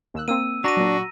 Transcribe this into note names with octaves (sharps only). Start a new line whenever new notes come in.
D#2 E6 F#6
A#3 C4 E6 D#7
D4 F#4 A#5 A#6 D#7
A#2 F#3